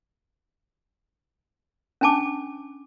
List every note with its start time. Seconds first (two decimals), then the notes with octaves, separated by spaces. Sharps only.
2.01 C#4 D4 G#5 A5 D6